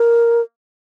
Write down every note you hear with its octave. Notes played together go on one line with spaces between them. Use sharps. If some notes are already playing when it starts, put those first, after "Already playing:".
Already playing: A#4